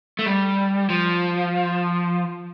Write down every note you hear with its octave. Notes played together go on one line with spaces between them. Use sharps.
A3
G3
F3